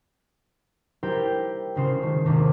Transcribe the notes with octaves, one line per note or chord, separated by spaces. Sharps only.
G3 E4 G4 A#4 C5 G5
G#1 C#3 C5
D#3 A3 C#4
G#1 D#2 C3